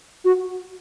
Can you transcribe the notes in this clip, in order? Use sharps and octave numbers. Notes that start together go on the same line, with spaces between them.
F#4